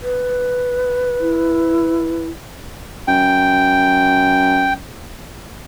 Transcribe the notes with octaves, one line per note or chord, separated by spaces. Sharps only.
B4
E4
F#2 G5